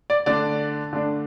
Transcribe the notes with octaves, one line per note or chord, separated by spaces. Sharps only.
D5
D3 A3 D4 D5
D3 A3 D4